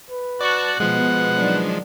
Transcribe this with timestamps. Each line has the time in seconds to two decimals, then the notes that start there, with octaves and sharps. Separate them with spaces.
0.10 B4
0.41 F#4 D5 A5 C#6 F#6
0.80 B2 F3 G#3 B4 F#5
1.37 D#3 F#3 D4